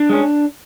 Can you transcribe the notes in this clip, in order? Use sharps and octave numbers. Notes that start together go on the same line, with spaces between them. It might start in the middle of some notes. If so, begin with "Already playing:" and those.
Already playing: D4
G#3 C#4